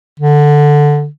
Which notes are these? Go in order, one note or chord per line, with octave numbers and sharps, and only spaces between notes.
D3